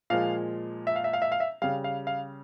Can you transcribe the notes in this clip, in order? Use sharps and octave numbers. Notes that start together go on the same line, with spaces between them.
A#2 F3 G#3 F5
E5
F5
E5
F5
E5
F5
E5
C#3 G3 F5
F5
F5